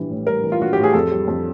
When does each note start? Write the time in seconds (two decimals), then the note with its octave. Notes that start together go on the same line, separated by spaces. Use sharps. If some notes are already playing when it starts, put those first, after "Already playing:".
Already playing: A#1 E3 G3
0.10 A2
0.27 G3 A#4
0.44 E3
0.52 F4
0.60 A#1 F#4
0.73 A2 G4
0.84 G#4
0.94 F2 A4
1.12 G3
1.28 F2